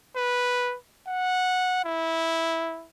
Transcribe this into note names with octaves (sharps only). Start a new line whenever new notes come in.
B4
F#5
E4